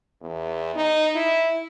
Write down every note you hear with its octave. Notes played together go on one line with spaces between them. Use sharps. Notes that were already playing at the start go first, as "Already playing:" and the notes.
E2
D#4
E4